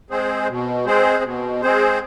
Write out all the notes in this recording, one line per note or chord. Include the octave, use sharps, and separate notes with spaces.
G#3 C4 G#4 C5
B2
G#3 C4 G#4 C5
B2
G#3 C4 G#4 C5